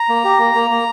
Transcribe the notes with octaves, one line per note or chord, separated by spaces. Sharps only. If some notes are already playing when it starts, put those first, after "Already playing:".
Already playing: A#5
A#3
G4
A#3
A#3
A#3